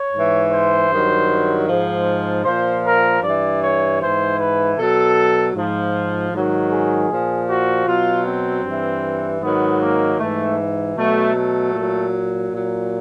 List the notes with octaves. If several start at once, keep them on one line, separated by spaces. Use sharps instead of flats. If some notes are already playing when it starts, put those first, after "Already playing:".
Already playing: C#5
G#2 E3
C5
G2 D#3 F#3
G#2 F3
A#2 F3 C5
A#4
G2 E3 D5
C#5
G#2 E3 C5
B4
B2 F#3 A4
G#2 F3
G#2 D#3 F#3
G#4
A#2 F3
F#4
B2 F#3 F4
C4
G2 E3
G#2 D#3 F#3 B3
A#3
G#2 E3 A3
B2 F#3 A3
A3
A#2 F#3
A#2 F#3